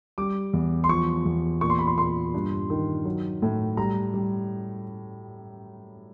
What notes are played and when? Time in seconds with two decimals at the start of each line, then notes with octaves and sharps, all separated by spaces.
0.18 G3 D6
0.53 E2
0.84 C6
0.89 F3 C#6
1.25 E2
1.61 A#2 C#6
1.70 C6
1.79 B5
1.87 C6
1.98 A#2 C6
2.34 G2
2.70 D#3
3.05 F#3
3.42 A2
3.77 G3 A#5
4.14 G3